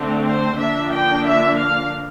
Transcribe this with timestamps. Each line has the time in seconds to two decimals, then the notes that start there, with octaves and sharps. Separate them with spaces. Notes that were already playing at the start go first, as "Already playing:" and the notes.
Already playing: D3 A3 C4
0.26 C5
0.58 D3 F3 A#3 D4 E5
0.91 G5
1.25 E5
1.57 F5